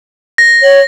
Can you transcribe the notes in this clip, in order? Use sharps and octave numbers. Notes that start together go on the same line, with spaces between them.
A#6
C#5